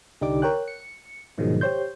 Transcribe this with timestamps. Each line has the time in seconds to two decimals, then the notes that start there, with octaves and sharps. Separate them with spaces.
0.21 C2 D3 D#4 G4 D5 D6
0.42 A#4 C#5 G5 F#6
0.68 C#7
1.38 G#2 B2 D#3 F3 F#3 G#3
1.61 G4 C5 C#5 C6 G6